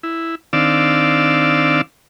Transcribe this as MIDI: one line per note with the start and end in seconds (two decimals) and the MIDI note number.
0.03 0.35 64
0.53 1.81 51
0.53 1.81 60
0.53 1.81 62
0.53 1.81 74
0.53 1.81 77
0.53 1.81 88